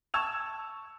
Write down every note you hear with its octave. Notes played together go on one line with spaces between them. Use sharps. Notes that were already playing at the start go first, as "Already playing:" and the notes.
A5 C#6 E6 G#6 E7 F7